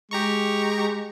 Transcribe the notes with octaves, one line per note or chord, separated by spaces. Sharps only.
G#3 G4 A#5 C#6